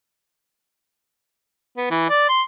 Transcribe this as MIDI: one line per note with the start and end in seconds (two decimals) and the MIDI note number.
1.77 1.86 59
1.91 2.09 52
2.10 2.26 74
2.29 2.42 84